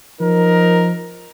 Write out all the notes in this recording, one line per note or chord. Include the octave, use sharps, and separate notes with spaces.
F3 D#4 A#4